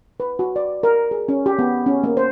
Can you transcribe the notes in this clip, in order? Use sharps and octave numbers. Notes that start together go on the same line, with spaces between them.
B4
F#4
D5
A#4
G#4
C#4
G4
B3
C#4
A#3
C5